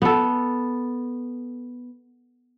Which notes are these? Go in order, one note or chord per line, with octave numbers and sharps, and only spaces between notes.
B3 A4